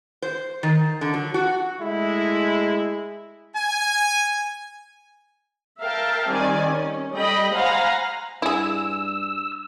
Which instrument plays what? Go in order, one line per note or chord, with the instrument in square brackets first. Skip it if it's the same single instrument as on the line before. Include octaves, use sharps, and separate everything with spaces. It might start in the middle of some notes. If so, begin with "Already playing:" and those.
[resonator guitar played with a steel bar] C5
D#3
D3
F#3
F#4
[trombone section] G#3 A3 E4
[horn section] G#5
[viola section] A#4 E5 F5 G5 A5
D#3 G3 C4 D5 G#5
C#4
G3 A4 D#5 G5 B5
C5 F5 F#5 G#5 A#5 B5
[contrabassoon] G2 [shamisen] E4 G#4 [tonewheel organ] E6